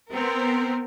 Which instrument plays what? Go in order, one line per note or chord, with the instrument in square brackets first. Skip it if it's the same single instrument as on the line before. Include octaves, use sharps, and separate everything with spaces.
[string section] B3 C4 A#4